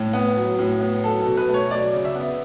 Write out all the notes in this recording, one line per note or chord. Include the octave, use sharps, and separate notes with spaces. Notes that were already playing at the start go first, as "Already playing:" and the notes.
Already playing: A2
B3
F#3
A2
B3
F#3 A4
A4
B2
B4
A3
C#5
F#3 D5
C#3
E5
B3